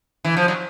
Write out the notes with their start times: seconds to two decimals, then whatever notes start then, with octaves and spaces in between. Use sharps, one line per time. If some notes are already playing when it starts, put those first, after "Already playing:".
0.25 E3
0.37 F3
0.48 F#3